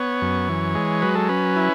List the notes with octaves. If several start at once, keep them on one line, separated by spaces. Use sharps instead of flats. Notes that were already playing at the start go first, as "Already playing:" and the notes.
Already playing: B3 C#5
F#2
E3
G#3
F#3 B4
A4
C#4 B4
E4